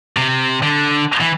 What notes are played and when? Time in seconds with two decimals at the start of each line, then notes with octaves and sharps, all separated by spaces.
0.17 C3
0.62 D3
1.21 E3